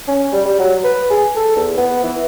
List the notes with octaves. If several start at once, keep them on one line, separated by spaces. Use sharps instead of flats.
C#4
G3
G3
F#3
B4
G#4
A4
E2
B3
E3